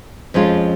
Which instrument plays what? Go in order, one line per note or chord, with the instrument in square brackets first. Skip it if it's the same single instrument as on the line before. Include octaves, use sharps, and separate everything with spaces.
[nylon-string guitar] F2 F3 G#3 C#4 F4